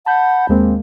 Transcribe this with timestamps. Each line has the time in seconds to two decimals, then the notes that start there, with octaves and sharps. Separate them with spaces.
0.06 F#5 A5 B5 G6
0.49 D#2 G#3 A#3 C4